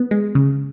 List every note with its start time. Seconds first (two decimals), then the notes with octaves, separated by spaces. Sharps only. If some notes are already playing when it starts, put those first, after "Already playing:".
Already playing: B3
0.11 G#3
0.35 C#3